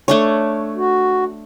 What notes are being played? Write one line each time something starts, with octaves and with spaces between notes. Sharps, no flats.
A3 D4 C#5
F#4